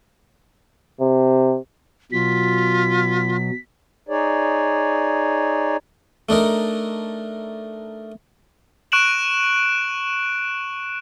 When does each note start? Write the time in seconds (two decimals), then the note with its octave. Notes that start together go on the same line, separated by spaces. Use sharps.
1.00 C3
2.12 B2 F#3 F4 B6
4.09 D#4 G#4 C#5 D5
6.29 A3 D4 D#4 A#4
8.92 C#6 F#6 D7 E7 F#7